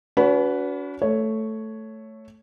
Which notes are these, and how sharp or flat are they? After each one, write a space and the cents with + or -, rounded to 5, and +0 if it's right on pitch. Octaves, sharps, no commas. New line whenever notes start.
C#4 +45 F#4 +0 B4 +0
A3 +0 C#5 +0